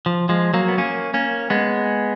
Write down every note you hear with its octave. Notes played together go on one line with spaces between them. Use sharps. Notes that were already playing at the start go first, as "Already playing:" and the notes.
F3
F3 G#3
F#3 A#3
B3
A#3 C#4
A#3 C#4
G#3 B3